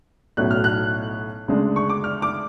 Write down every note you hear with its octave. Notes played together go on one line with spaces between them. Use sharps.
B1 A2 F#3 C#4 F#6
F6
F#6
D2 C#3 G#3 D4
C#6
D6
F6
D6